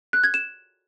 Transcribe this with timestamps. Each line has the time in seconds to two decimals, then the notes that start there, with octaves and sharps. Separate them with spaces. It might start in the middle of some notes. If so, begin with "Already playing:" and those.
0.13 F#6
0.24 G#6
0.34 E7